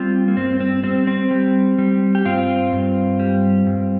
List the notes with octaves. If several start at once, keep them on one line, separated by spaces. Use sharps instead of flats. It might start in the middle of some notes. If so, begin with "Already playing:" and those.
Already playing: G3 C4 F4
A#3
G2 C4
C4
G3 C4
C4
G3
G3
G4
G2 C4 F4
G2
G3
G2